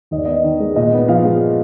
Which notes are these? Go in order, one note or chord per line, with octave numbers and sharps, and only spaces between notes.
D#2 D#5
D5
B3 D#5
D#3
G#3
A#2 D#5
B3
F3 F5
G#3